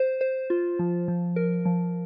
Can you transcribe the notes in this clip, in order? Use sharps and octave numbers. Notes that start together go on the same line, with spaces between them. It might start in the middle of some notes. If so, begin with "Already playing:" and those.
Already playing: C5
C5
F4
F3
F3
A#4
F3